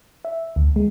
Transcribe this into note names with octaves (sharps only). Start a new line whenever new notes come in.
E5
D2
G#3